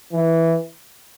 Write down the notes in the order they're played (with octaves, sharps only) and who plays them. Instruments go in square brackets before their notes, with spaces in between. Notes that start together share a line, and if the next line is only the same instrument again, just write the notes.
[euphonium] E3